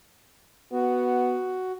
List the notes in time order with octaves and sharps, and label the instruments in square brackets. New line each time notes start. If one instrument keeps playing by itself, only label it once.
[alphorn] B3 [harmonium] F#4